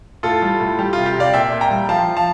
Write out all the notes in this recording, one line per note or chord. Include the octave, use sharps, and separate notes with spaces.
A2 F4 A4
G3
A2
G3 G4
C3 F4
G4
C3 D5 F5
A#2 E5 G5
A#2
G5 A#5
G3
F3 F5 A5
F3
F5 A5